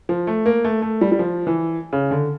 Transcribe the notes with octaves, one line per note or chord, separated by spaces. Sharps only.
F3
A3
A#3
A3
A3
G3
G3
F3
E3
C#3
D3